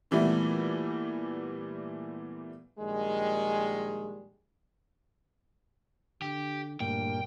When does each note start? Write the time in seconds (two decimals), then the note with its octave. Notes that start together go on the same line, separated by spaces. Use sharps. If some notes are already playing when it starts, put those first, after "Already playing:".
0.11 A#2 E3 G3 A3 B3
2.79 A#1 D#3 G3 G#3
6.22 D3 G4
6.80 D2 G2 A#2 A#3 G5